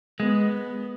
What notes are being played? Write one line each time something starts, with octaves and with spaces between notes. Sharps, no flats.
G#3 B3